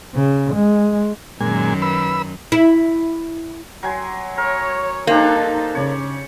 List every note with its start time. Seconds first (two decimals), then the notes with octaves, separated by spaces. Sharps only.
0.15 C#3
0.55 G#3
1.40 F#2 A#2 D#3 G#3 G#5
1.82 B4 B5 E6
2.52 E4
3.83 F#3 G#5 C6
4.38 A#4 C#5
5.07 A#3 D4 D#4 G4 A4 C5
5.75 C#3 C#5 D5